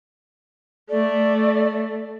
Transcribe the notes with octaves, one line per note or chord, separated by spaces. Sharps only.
A3 D5